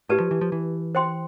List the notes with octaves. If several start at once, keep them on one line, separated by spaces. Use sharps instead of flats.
A2 G4 B4 D5 A5
F3
E3
F3
E3
C5 G5 C6